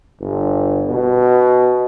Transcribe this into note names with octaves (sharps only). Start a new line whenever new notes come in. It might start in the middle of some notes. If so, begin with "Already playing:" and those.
G1
B2